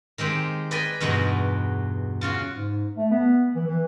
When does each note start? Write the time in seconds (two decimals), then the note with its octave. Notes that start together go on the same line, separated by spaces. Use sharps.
0.18 D#3 G#3 C4 G4
0.71 B4 D5 D#5 G5 G#5
1.00 E2 G2 B2 G#3 D#4 F#4
2.21 C#3 F4 F#4
2.53 G#2
2.97 A3
3.11 B3
3.55 E3
3.67 E3